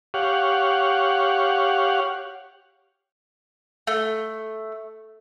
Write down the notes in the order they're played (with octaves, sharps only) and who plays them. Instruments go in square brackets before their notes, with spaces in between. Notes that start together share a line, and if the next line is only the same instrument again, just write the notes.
[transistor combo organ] G4 C#5 F5 F#5
[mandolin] A3